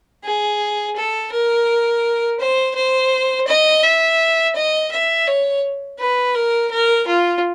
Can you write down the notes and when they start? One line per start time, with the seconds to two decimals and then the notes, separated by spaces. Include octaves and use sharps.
0.24 G#4
0.96 A4
1.32 A#4
2.40 C5
2.75 C5
3.47 D#5
3.83 E5
4.56 D#5
4.92 E5
5.27 C#5
5.99 B4
6.35 A#4
6.71 A#4
7.07 F4